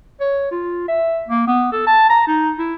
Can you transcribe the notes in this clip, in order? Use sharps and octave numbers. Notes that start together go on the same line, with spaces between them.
C#5
F4
E5
A#3
B3
A4
A5
A#5
D#4
E4